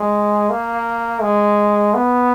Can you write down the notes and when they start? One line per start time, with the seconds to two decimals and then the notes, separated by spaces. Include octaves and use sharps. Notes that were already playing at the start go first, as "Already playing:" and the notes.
Already playing: G#3
0.50 A#3
1.21 G#3
1.94 B3